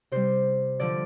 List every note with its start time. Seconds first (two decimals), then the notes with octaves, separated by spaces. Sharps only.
0.12 C3 G3 C5
0.80 D3 F3 D5